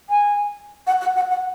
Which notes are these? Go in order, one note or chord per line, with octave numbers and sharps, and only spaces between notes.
G#5
F#5
F#5
F#5
F#5